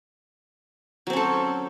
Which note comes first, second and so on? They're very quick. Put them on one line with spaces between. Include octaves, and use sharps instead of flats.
F#3 C4 C#4 A4